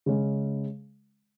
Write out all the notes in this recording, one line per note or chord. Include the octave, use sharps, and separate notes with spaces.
C#3 G#3 C#4